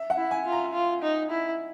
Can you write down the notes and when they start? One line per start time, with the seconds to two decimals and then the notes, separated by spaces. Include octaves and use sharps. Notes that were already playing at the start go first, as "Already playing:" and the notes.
Already playing: E5
0.10 F#5
0.17 E4
0.31 G#5
0.45 F4
0.52 A#5
0.73 F4
1.02 D#4
1.31 E4